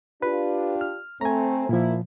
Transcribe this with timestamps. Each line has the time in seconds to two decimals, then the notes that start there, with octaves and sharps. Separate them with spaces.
0.22 D4 F4 G4 B4
0.81 F6
1.21 A3 C4 C5 G#5 A#5
1.69 A#2 F3 A#3 E4